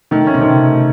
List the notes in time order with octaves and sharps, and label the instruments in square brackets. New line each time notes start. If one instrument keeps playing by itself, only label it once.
[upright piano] D#3 [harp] A3
[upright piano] C#4
[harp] C3 C4
[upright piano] D#3